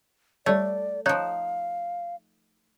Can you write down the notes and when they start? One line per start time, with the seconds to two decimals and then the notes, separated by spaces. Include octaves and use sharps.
0.46 G3 A3 C#5 D5
1.06 F3 D#4 C#5 F5 F#6 E7